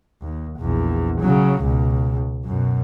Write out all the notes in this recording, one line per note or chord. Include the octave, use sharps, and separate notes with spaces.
D#2
A#1 E2
C#3 F#3
C#2 B2
F#2 B2